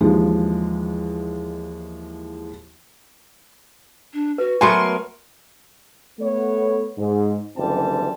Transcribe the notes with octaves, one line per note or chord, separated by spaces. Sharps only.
D#2 E3 F3 G#3
D4
F#4 B4
F#3 A3 B3 A#4 G#5 C6
A3 B3 C#5
G#2
F#1 D2 E3 G3 C4 A5